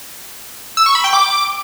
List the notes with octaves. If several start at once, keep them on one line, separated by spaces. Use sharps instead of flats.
E6
C#6
B5
G5
D6